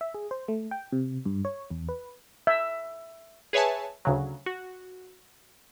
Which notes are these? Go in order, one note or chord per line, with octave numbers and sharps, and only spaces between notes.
E5
G#4
C5
A3
G5
C3
G2
C#5
E2
B4
E5
G#4 B4 C#5 E5 G#5 A5
D2 C#3 F#3
F#4